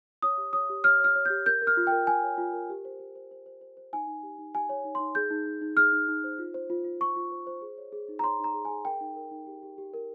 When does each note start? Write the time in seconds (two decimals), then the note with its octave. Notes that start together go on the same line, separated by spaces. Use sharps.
0.22 C#5 D#6
0.38 G4
0.53 C#5 D#6
0.70 G4
0.84 C#5 F6
1.00 C#5 F6
1.16 C#5
1.25 G6
1.30 G4
1.46 A#4 G6
1.62 A#4
1.67 F6
1.77 F4
1.87 G5
1.92 A#4
2.07 F4 G#5
2.23 C#5
2.38 F4
2.53 A#4
2.70 G4
2.85 C5
3.00 G4
3.15 C5
3.31 C5
3.46 C5
3.61 C5
3.77 C5
3.93 D#4 G#5
4.07 D#4
4.23 G4
4.39 D#4
4.54 G4 G#5
4.69 C#5
4.84 D#4
4.95 C6
5.00 D#4
5.15 G#4 G6
5.30 D#4
5.46 D#4
5.61 D#4
5.77 G#4 F6
5.92 D#4
6.08 D#4
6.24 C5
6.39 F4
6.54 C5
6.70 F4
6.84 F4
7.00 F4 C#6
7.16 F4
7.32 C5
7.47 C5
7.62 G#4
7.78 C#5
7.93 G#4
8.08 D#4
8.19 A#5
8.24 C#5 C6
8.40 D#4 A#5
8.54 G#4
8.65 G#5
8.70 G#4
8.85 A#4 G5
9.01 D#4
9.16 A#4
9.31 D#4
9.47 G4
9.63 G4
9.78 G4
9.94 A#4